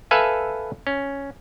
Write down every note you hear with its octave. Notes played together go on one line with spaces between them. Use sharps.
A4 B4 E5 F5 G#5
C#4